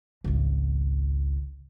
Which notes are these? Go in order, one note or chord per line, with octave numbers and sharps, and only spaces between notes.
G#1 C#2